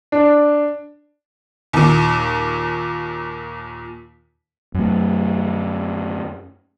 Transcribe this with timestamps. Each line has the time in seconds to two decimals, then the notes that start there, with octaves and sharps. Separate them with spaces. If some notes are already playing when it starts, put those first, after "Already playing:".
0.12 D4
1.73 D#2 A#2
4.74 F#2 A3